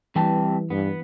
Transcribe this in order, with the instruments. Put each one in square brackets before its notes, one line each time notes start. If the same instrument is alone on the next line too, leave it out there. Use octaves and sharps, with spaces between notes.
[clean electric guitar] C3 G5 A5 [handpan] E3 [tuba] G3
[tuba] G2 [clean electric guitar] B3